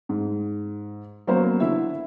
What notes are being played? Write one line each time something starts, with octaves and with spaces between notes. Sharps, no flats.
G#2
F#3 A#3 B3 C#4 C5 C#5
D3 E4 E5